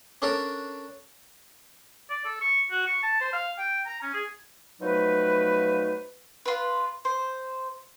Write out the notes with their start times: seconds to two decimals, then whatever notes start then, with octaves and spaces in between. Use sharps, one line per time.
0.22 C#4 D4 A4 A#4 D5
2.10 D5
2.25 A4
2.41 C#6
2.71 F#4
2.86 C#6
3.02 A5
3.21 C5
3.33 F5
3.58 G5
3.86 A#5
4.02 C#4
4.14 G#4
4.81 B2 F3 F#3 A3 D#4 B4
6.45 F4 B4
7.05 C5